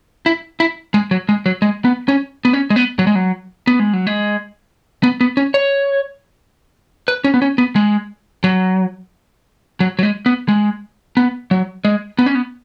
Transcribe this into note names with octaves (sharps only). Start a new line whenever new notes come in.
E4
E4
G#3
F#3
G#3
F#3
G#3
B3
C#4
B3
C#4
G#3
B3
F#3
G#3
F#3
B3
G#3
F#3
G#3
B3
B3
C#4
C#5
B4
C#4
B3
C#4
B3
G#3
F#3
F#3
F#3
G#3
B3
G#3
B3
F#3
G#3
B3
C#4
B3